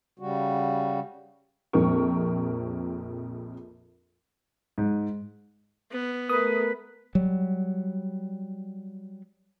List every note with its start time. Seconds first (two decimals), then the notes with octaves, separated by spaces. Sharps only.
0.19 C#3 G3 F#4
1.73 A#1 F2 C4 A#4 C#6
4.78 G#2
5.91 B3
6.29 A3 A#4 B4 D#6
7.15 F#3 G3